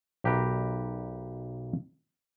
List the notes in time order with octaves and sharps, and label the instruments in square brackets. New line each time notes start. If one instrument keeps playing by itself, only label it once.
[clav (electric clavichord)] B1 G4 A#4 B4